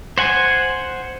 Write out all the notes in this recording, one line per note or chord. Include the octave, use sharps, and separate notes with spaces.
C5 F#5 G#5